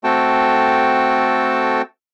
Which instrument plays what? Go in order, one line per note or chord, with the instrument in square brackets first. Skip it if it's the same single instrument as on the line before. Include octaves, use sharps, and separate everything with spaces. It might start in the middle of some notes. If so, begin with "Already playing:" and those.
[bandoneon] A3 C4 F#4 A4 G5 A5